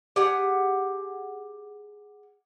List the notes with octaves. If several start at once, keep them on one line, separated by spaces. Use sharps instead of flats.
G4 G#4 F#5